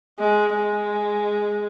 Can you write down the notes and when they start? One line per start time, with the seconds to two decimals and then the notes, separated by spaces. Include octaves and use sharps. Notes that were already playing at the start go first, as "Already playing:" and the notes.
0.20 G#3
0.55 G#3